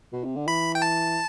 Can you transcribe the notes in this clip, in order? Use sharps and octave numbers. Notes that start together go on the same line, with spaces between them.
B2
C3
D3
E3 B5
G5
A5